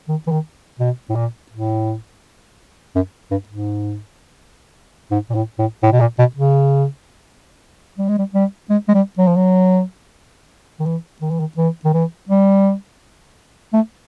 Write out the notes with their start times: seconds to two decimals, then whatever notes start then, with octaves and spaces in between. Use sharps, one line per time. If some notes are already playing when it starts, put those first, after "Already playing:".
0.08 D#3
0.27 E3
0.32 D#3
0.79 B2
1.09 A2
1.15 A#2
1.52 A2
2.95 F#2
3.31 G2
3.49 G#2
5.11 G#2
5.30 A#2
5.35 A2
5.59 A2
5.83 A2
5.92 B2
6.00 A#2
6.19 B2
6.36 C#3
7.98 G3
8.08 G#3
8.19 G3
8.34 G3
8.70 G#3
8.88 G#3
8.94 G3
9.18 F#3
9.27 F3
9.36 F#3
10.80 D#3
10.86 E3
11.21 D#3
11.31 E3
11.39 D#3
11.57 E3
11.85 D#3
11.93 E3
12.29 G3
13.73 A3